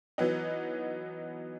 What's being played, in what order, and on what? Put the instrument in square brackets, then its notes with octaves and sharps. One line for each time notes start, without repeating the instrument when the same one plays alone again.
[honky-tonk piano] E3 F#3 B3 D#4